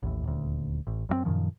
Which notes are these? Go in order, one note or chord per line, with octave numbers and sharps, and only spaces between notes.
A1 D#2 A2
D#1 D2
A1
F#2 D#3 C4
F#2 A#2 D#3 F3